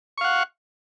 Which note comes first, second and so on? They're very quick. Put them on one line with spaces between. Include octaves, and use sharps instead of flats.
C#6 F5 F#5